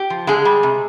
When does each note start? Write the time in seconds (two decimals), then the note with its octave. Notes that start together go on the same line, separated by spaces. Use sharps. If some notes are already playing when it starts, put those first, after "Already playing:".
Already playing: G4
0.10 F3
0.27 D3 G#3 G#4
0.45 G3
0.63 C3